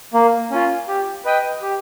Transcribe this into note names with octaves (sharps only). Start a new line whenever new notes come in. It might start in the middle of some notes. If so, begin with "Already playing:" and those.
A#3
C#4 F4
G4
B4 D#5 G5
G4